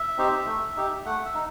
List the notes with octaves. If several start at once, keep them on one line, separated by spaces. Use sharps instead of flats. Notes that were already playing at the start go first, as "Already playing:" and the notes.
Already playing: E5
C4 D#4 G4
A3
D#4 G4
A3 F#5
E5
D#4